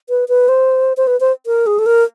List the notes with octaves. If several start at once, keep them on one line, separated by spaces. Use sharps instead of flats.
B4
B4
C5
C5
B4
C5
A#4
G#4
A4
A#4